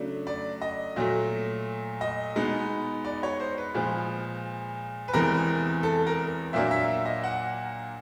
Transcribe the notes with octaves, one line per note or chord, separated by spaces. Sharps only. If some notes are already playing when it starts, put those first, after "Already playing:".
Already playing: C#3 F#3 A3 D4
D5
D#5
A#2 F#3 A3
D#5
B2 G#3 B3 D#4
D5
C#5
C5
B4
A#2 F3 G#3
B4
E2 C3 E3 G#3 A#4
A4
A#4
A#2 F#3 A#3 D4 E5
E5
E5
D#5
F#5